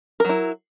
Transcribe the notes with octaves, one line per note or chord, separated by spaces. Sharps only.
F#3 E4 A#4